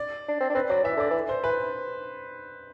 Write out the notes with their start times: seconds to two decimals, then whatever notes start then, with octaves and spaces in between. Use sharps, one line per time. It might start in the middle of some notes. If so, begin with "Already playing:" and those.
Already playing: D5
0.28 D4
0.41 C4
0.50 D4
0.55 C4 B4
0.70 F#3 D5
0.84 E3 E5
0.97 D3 D5
1.11 E3
1.29 C5
1.44 E3 B4